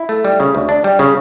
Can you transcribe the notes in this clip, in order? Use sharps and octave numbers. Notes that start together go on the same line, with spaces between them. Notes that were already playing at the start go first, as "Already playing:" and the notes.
Already playing: E4
A3
G3
C#3
D2
D4
G3
C#3